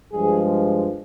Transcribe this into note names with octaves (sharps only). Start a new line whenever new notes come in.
G2 F3 G#3 G#4